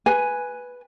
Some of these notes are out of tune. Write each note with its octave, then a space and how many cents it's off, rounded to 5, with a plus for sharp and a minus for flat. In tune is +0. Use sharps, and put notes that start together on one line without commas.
B4 +0 G#5 +0